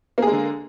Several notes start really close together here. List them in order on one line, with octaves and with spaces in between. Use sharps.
A#3 G#4 G#3 D3